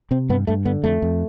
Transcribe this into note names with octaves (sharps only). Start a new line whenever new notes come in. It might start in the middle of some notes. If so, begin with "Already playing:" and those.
C3 C4
G2 B3
G2 A3
D3 B3
F2 A3
F2